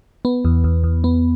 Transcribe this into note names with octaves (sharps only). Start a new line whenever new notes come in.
B3
E2
E2
E2
B3